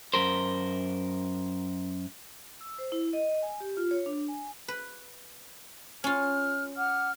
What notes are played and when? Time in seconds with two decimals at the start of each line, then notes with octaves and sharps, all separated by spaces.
0.14 F#2 A#4 C5
2.61 E6
2.79 C5
2.92 E4
3.13 D#5
3.43 G#5
3.60 G4
3.77 F4
3.91 C#5
4.06 D4
4.28 G#5
4.68 B4
6.04 C#4 F4 F6
6.76 F#5 D6 F6